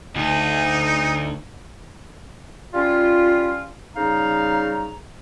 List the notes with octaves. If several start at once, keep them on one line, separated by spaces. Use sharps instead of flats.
D2 D#4
G3 C#4 F4
C#3 G3 D#4 F5 A#5